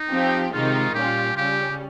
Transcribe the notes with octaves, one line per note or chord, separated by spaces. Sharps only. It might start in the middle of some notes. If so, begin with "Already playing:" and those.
Already playing: D#4
F3 C4 G4
C3 D#3 G#3 D#4 F4
A#2 G3 C#4 F4 G4
C#3 G3 C#4 G4